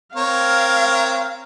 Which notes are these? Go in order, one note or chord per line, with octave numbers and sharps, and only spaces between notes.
C4 A#4 C#5 F5